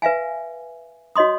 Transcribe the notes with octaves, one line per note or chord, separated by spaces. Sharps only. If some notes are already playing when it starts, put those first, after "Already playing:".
B4 E5 F5 G#5
F#4 C#5 D#5 C6 D#6